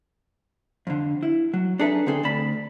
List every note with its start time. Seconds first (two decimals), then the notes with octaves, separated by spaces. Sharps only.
0.87 F2 D3
1.23 E4
1.54 F#3
1.79 D4 D#4 G#4 A4 B4 E5
2.06 D3 C4 G#4 A4
2.23 D2 D5 A5 B5